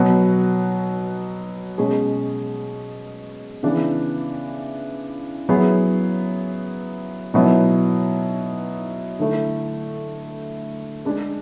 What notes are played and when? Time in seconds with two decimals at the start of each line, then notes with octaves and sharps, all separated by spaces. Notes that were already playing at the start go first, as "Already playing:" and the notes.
Already playing: B2 F#3 B3 F#4
1.78 B2 G#3 C#4 G#4
3.63 C#3 E3 B3 D4
5.49 F#3 B3 E4 G#4
7.34 B2 F#3 B3 E4
9.19 D3 A3 E4
11.05 G#3 D4 G#4